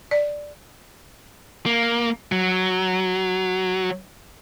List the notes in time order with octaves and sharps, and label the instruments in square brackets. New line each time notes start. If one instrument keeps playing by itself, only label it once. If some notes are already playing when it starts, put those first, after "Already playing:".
[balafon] D5
[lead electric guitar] A#3
F#3